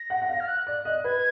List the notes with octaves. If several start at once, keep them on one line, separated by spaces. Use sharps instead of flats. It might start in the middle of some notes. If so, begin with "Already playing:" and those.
Already playing: A#6
F#5
F#5
F5
F6
F#6
D5
D#5
B4 G#6